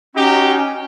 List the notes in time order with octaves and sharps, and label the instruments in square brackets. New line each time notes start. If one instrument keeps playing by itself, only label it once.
[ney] C#4 [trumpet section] D#4 F#4 G4